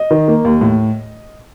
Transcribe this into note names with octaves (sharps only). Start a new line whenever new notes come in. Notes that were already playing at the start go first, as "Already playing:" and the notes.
Already playing: D#5
D#3
A#3
D#2
A2